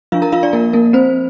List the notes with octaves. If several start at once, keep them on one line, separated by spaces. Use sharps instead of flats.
F3 D4 F4 F5
A#4 A#5
F4 F5
D4 D5
A#3 A#4
A#3 A#4
C4 C5